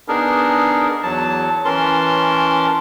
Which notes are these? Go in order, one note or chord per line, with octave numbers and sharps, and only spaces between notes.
B3 D4 D#4 G#4 A#4
E2 F#3 A5
E3 C#4 A#4 A5 C6